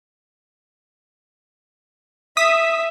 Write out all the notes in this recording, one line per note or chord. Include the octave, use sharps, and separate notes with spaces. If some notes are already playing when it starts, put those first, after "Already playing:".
E5 D#6 B6